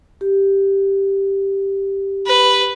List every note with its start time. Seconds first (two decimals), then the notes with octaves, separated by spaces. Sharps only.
0.21 G4
2.26 B4